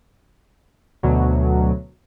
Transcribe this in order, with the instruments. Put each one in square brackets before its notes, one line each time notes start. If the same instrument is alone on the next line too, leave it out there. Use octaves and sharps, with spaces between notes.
[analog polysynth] D2 B2 F#3